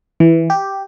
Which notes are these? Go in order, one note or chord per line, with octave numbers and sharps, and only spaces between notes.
E3
G4